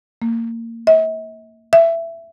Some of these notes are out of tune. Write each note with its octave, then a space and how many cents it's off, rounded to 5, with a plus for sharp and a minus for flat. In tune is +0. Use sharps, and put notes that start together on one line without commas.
A#3 -25
E5 -45
E5 +15